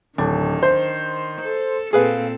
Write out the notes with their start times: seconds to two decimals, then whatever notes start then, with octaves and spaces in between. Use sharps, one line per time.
0.18 D1 D#3 D4
0.63 C5
1.41 A4
1.93 A#2 C4 G#4 A4 B4 F5